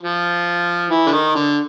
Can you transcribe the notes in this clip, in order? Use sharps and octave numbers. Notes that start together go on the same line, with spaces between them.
F3
E3
D3
D#3
D3